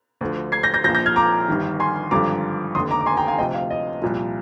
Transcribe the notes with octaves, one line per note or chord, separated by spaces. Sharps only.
D2 D3 F3
G#6 C7
G6 A#6
G6 A#6
A#1 A#2 F3 G6 A#6
G6 A#6
F6 G#6
A#5 D6
G1 G2 D#3
G#5 C6
G#1 G2 D3 F3 A#5 D6
F1 D#2 D3 C6 D#6
A#5 D6
D6
G#5 C6
G5 A#5
F5 G#5
D2 C3 F3 D#5 G5
F5
D#5
C2 A#2 F3